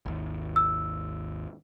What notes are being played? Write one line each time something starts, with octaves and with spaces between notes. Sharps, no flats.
G#1 D#2
E6